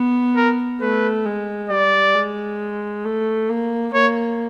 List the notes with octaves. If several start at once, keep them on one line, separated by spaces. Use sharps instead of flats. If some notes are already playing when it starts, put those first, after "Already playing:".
Already playing: B3
A#4
A3 B4
G#3
G3 D5
G#3
A3
A#3
A#3 C#5